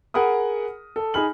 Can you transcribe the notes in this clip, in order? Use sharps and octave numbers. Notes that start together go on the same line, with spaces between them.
G#4 A#4 F#5 B5 D#6
A4
D#4 G#4 G#5 B5 F6 F#7